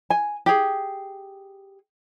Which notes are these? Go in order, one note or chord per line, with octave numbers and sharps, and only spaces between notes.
G#5
G4 G#4